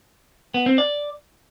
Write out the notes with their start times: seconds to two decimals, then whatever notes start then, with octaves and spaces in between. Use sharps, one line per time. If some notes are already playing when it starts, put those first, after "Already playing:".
0.54 B3
0.66 C4
0.78 D5